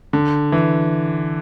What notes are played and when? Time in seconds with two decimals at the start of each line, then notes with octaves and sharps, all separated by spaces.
0.13 D3
0.52 E3